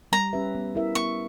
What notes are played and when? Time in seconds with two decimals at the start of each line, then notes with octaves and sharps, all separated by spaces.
0.12 G3 A#5
0.33 C#4 G4 B4 E5
0.55 B3
0.75 E4 A#4 E5
0.95 B3 C#6